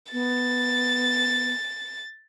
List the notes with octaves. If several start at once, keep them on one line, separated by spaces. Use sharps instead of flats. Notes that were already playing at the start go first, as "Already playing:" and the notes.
B3 A6